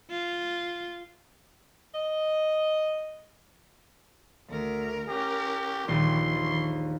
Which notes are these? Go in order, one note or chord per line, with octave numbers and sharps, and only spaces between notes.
F4
D#5
D2 A#4
C#4 G4 A#4
A#1 D#2 E3 C6